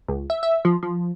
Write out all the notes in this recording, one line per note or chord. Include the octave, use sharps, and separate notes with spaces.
C#2
E5
E5
F3
F3